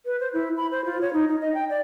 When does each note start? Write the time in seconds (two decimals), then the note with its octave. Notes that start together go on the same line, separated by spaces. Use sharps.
0.06 B4
0.20 C5
0.33 E4
0.57 B5
0.71 C5
0.85 F4
1.01 C#5
1.13 D#4
1.29 D#4
1.41 D#5
1.54 G5
1.70 D5